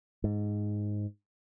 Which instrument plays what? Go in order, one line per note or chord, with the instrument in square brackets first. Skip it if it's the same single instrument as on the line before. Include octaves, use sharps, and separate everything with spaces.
[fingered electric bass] G#2